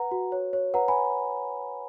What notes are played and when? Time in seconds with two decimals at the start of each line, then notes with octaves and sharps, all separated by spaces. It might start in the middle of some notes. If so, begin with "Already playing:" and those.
Already playing: B4 F#5 A#5
0.11 F#4
0.32 C#5
0.53 C#5
0.74 B4 F#5 A#5
0.88 G#5 B5